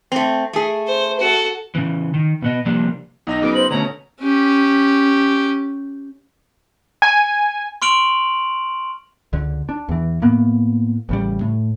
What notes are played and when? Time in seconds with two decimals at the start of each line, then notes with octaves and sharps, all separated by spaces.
0.12 A3 C4
0.53 A3 G#4
0.87 C5
1.19 F#4 A4
1.75 C#3 E3
2.14 D#3
2.42 B2 B3 D#5
2.65 C3 F3 G3 A#3 D4
3.27 B1 D#4 D#5 A#6
3.42 C#3 F#3 B3 D6
3.54 C5 F#7
3.71 B2 D3 A3 C#4 C#5 A#5
4.20 C#4 G4
7.02 G#5
7.82 C6 C#6 F6 D7 F7 F#7
9.33 C#2 D3
9.69 D4
9.89 E2 E3
10.22 A2 A#3 B3
11.09 A1 C#3 G3
11.41 A2